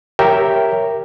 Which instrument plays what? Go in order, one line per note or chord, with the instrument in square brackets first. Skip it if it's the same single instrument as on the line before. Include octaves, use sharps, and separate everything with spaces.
[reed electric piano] G4 A#4 C#5 E5 G5